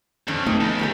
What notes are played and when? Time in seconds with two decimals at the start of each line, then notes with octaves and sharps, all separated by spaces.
0.28 F2 D#3 C#4 D4
0.46 A3 B3 D#4
0.61 C#2
0.79 D#3 G4 A4